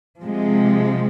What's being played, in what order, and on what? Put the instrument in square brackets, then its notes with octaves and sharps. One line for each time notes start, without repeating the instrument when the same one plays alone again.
[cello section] C3 F3 G#3